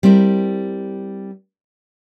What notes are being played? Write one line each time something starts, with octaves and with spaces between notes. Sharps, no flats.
G3 C4 E4 A#4